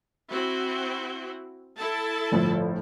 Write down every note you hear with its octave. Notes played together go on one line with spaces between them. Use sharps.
C4 E4 F#4
E4 A4 A5
G1 A2 F3